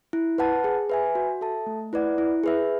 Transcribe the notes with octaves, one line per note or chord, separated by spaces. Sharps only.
E4
B4 F#5 A5
G#4
B4 E5 G#5
F#4
A4 E5 A5
A3
E4 B4 D5 F#5
E4
G#4 B4 E5